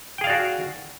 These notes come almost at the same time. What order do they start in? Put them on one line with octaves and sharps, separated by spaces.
G5 G#4 F5 D5 F#4